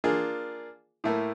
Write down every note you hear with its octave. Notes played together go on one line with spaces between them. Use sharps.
A#3 D4 F4 G#4
A2 A3 A#3